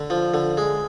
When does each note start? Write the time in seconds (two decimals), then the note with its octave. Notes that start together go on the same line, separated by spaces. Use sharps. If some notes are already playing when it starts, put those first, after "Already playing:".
Already playing: D3
0.10 F3
0.34 D3
0.57 G#3